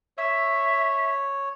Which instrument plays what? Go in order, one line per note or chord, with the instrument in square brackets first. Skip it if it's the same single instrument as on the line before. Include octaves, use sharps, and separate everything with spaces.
[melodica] C#5 [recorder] E5